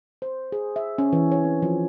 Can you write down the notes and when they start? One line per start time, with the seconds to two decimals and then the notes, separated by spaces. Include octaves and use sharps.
0.22 C5
0.52 G#4
0.76 E5
0.98 C#4
1.13 E3
1.32 C#5
1.44 C4
1.62 F3